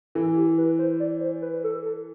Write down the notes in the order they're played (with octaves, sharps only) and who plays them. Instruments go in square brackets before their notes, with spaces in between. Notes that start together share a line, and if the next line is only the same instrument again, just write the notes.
[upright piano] E3 [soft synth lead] A4
[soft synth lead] G4
B4
C5
D5
C5
B4
A4
A4